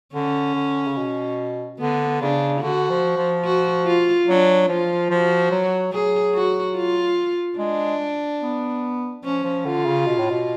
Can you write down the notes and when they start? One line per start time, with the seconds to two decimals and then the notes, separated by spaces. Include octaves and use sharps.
0.14 D3 C#4
0.55 D3
0.87 C#3
0.97 B2
1.79 D3 B3
2.21 C#3 D4
2.62 D3 F#4
2.90 F3
3.17 F3
3.45 F#4
3.86 F4
4.27 F#3 D4
4.68 F3 F4
5.10 F3 F#4
5.52 F#3
5.93 F#3 G#4
6.34 F#4
6.76 F4
7.58 G#3 D4
8.41 B3
9.24 F3 C#4
9.44 F3
9.65 D3 F4
9.86 C#3
10.06 B2
10.19 A2
10.30 B2